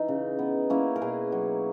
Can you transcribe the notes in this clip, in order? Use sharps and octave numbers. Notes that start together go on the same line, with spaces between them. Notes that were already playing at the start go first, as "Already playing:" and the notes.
Already playing: E3 D#4
C#3
B3
A#3 C#4 E4
A#4
B2 G#4 B4
F#3